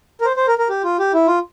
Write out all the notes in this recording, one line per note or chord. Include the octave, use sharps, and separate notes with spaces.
A#4
C5
C5
A#4
A#4
G4
F4
G4
E4
F4